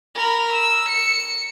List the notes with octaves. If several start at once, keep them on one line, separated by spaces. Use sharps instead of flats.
A#4 B5
E6
C#7